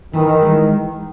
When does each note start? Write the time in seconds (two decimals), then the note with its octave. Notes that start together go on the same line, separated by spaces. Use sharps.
0.13 D#3 E3
0.42 G#3